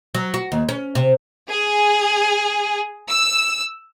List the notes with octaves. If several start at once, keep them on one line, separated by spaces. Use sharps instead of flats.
F#3
F#4
D#2
C#4
C3
G#4
E6